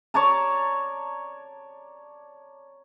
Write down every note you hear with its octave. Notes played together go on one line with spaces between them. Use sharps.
C#5 D5 A5 A#5